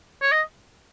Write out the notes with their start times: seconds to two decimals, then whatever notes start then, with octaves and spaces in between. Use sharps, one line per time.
0.22 C#5
0.32 D#5